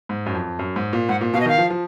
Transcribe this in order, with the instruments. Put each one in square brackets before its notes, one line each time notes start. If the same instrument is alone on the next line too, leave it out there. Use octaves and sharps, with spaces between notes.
[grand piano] G#2
F#2
F2
F#2
G#2
A#2
[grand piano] G#2 [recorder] F#5
[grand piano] A#2
[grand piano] B2 [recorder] F5
[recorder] D#5
[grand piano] D#3 [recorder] F5
[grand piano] F3
F3